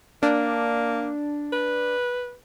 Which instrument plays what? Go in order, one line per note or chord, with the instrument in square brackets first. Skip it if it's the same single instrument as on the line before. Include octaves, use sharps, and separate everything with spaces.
[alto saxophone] A#3 [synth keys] D4
[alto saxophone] B4